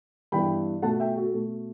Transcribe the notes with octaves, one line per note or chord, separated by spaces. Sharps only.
G2 E3 B3 G5 B5
B2 A3 F#5 A5
E5 G5
F#4 A4
B2 A3